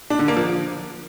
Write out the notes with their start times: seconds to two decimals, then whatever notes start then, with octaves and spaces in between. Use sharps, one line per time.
0.10 D4
0.19 D3
0.28 A#3
0.37 F3